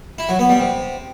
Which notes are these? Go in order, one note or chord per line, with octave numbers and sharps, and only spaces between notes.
E4
F#3
B3
G3
C3